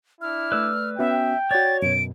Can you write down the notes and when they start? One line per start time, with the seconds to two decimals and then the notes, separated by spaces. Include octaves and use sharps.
0.21 D4 E4 F6
0.52 A3 B4 D5 E6
0.99 B3 C#4 F#4 E5 G5
1.51 F#4 C#5 D5 A6
1.82 F#2 B2 D7